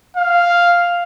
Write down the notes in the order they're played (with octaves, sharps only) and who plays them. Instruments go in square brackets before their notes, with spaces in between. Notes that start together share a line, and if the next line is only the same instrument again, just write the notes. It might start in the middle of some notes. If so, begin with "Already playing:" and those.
[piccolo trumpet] F5